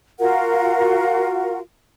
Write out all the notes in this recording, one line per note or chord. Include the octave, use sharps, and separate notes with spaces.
F4 F#4 A#4 F#5